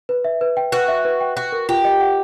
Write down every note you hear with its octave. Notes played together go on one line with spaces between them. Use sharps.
B4
E5
B4
G5
F#4 B4
E5
B4
G5
F#4 F#5
A#4
F4 G4
D#5
F#5